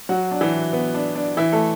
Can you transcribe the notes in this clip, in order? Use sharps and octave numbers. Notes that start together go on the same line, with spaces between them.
F#3 F#4
D4
E3 E4
B3
D4
D4
E3 E4
A3 A4